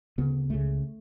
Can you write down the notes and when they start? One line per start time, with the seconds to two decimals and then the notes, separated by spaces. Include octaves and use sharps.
0.18 D2 C#3 B3
0.49 C#2 C#3 A3